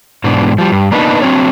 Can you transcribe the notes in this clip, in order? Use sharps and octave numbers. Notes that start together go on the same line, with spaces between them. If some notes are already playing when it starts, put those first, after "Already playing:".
G#2 B2 E3 D4
F3 G3
G2
A#3 B3 D4 D#4 B4
F#3 C4 D4 C#5